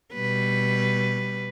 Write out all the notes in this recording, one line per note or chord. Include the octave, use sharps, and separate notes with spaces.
B2 G3 B4